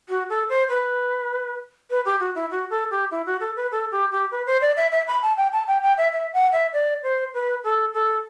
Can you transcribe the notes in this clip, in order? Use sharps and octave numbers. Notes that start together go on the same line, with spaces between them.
F#4
A4
C5
B4
B4
G4
F#4
E4
F#4
A4
G4
E4
F#4
A4
B4
A4
G4
G4
B4
C5
D5
E5
E5
B5
A5
G5
A5
G5
G5
E5
E5
F#5
E5
D5
C5
B4
A4
A4